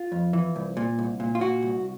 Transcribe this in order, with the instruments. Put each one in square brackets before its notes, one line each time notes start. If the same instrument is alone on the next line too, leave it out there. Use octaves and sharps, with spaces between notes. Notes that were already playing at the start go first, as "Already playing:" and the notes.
Already playing: [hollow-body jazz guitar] F4
F2
E3
C2
A#2
C2
A#2
F4
A#2 F#4
C2